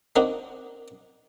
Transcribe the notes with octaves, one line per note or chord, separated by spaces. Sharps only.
A#3 C4 D4 D#4 F#4